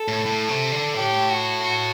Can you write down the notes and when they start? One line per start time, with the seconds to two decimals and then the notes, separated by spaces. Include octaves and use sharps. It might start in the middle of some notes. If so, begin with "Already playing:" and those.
Already playing: A4
0.08 A2
0.25 A2
0.49 C3
0.72 D3
0.95 A2 G4
1.29 F#4
1.63 F#4